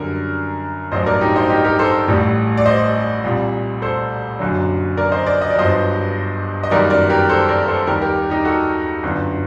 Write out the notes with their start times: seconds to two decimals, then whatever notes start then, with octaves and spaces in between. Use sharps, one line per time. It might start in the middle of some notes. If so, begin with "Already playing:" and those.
Already playing: F#2 D3 G3 A#4
0.92 A1 G2 F#3 C5 D#5
1.06 A#4 D5
1.21 D#4 G4
1.36 C5 D#5
1.50 D#4 G4
1.64 G4 A#4
1.79 A4 C5
2.08 A1 A2 G3
2.57 D5
2.66 C5 D#5
3.24 C2 A#2 G3
3.82 A4 C5
4.39 F#1 F#2 D3 F#3
4.97 A#4 D5
5.12 C5 D#5
5.26 A#4 D5
5.42 D#5
5.50 D5
5.55 G1 G2 F#3 C5 D#5
6.63 D#5
6.71 F#1 F#2 D#3 G3 A#4 D5
6.90 A#4 D5
7.09 G4 A#4
7.29 A4 C5
7.49 A#4 D5
7.68 A4 C5
7.87 D#2 D#3 G3 G4 A#4
8.01 G4 A#4
8.30 D#4 G4
8.45 F#4 A4
9.03 G1 F#2 D3